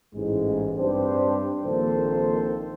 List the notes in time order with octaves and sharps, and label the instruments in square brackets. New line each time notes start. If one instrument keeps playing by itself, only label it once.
[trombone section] A1 G#2 G#3
G2 C4 D4 G4 C5
A#1 D#3 A#3 C4 A4 C5